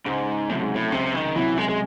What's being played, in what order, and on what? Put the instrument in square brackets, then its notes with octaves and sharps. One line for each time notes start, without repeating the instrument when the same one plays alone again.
[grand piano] C#2 [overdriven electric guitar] G#2
[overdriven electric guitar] A2 [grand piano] C3 F#3
[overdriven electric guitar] G#2
A2
[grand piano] C#2 [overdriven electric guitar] C3
[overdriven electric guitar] D#3
[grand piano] C3 F#3 [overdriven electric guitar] E3
[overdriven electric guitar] G#3
G#3